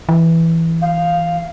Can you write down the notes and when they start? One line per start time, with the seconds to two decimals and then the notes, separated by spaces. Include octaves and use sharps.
0.09 E3
0.81 F5